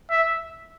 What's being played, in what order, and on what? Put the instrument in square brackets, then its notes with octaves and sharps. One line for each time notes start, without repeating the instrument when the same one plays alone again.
[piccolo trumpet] E5